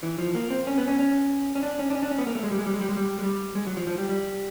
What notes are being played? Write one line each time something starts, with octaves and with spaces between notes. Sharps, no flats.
E3
F3
A#3
C4
C#4
B3
C#4
C#4
C#4
D4
C#4
D4
C#4
D4
C#4
B3
A#3
A3
G#3
G3
G#3
G3
G#3
G3
G#3
G3
G#3
G3
G#3
F#3
F3
F3
G3
G3